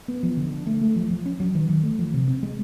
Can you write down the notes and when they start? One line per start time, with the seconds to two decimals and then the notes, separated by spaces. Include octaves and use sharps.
0.08 B3
0.23 F3
0.37 D3
0.52 D4
0.67 A3
0.81 A3
0.96 F3
1.10 F3
1.26 C#4
1.40 F#3
1.55 D#3
1.69 D#3
1.83 A3
1.99 F3
2.14 C3
2.28 C4
2.43 G#3